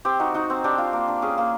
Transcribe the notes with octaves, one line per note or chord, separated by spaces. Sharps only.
C4 G4
D#4 F#4
D#4 F#4
C4
D4 G4
F4
A#3
D4
C#4 G#4
A#3